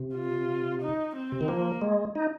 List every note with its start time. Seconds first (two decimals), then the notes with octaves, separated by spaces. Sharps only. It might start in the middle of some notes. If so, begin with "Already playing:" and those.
Already playing: C3
0.15 F4
0.82 D#4
1.15 C4
1.32 C3
1.41 D#3
1.48 F3 A#3
1.82 G#3
2.15 D#4